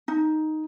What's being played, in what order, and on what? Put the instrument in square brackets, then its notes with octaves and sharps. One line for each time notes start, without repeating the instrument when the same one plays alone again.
[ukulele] D#4